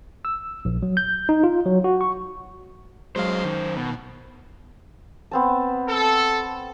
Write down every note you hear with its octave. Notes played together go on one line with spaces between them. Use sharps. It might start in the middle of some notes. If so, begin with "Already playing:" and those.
E6
A#1
F#3
G6
D#4
F4
F#3
F#4
C#6
F#2 F#3 G#3 C5 F5
D#3
B2
B3 C4 A5
A4